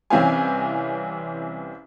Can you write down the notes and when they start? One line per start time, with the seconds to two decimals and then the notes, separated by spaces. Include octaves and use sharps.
0.10 C2 E3 C4 C#4 F5 G#5